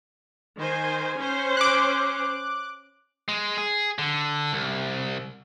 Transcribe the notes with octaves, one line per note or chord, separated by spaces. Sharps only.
D#3 C5 G#5
C#4 C5
D6 F#6
G#3
G#4
D3
C2